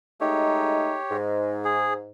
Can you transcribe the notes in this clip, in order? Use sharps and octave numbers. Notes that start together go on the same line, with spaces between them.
G#3 A3 D#4 G4 C#5
G#2
G#4